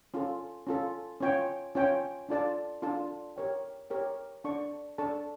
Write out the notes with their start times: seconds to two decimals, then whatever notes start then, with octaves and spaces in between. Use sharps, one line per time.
0.14 C#4 F4 A4
0.67 C#4 F4 A4
1.20 C#4 F4 C#5 G5
1.75 C#4 F4 C#5 G5
2.29 D4 F4 A4 D5 A5
2.82 D4 F4 A4 D5 A5
3.36 G4 A#4 C#5 G5
3.90 G4 A#4 C#5 G5
4.44 D4 A4 D5 A5 C#6
4.98 D4 A4 D5 A5 C#6